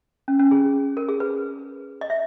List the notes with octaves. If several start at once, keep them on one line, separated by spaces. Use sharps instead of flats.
C#4
C#4
G#4
A#4
G#4
B4
D#5
E5